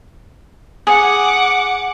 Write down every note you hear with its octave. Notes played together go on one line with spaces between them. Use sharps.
G#4 F#5 D6